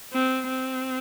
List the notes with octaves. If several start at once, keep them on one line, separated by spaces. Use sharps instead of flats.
C4
C4